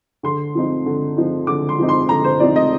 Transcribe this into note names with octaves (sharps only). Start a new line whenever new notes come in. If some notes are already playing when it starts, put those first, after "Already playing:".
D3 C6
F3 C4 D#4
D3
F3 C4 D#4
D3 D6
C6
F3 C4 D#4
C6
D3 A#5
C5
F3 C4 D#4 D5
D#5